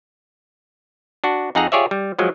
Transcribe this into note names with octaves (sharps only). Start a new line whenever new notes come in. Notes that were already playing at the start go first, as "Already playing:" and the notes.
D4 F#4
F2 D#4 G#4 F#5 A#5
F4 G4 G#4 C#5 D5 E5
G3
F3 F#3 G#3